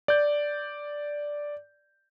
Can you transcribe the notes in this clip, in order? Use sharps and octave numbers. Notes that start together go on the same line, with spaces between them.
D5 G6